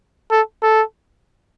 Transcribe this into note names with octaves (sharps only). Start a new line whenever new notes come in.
A4
A4